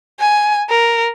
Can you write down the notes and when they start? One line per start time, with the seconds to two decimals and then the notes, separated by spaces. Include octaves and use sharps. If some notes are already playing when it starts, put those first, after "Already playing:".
0.20 G#5
0.70 A#4